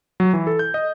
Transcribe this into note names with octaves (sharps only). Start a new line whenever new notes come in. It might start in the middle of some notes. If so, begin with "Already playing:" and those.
F#3
E3
A4
G6
D#5